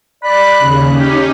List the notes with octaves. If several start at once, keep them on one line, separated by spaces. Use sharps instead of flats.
D5 B5 F#6
D#2 C#3
C#4 D#4 G4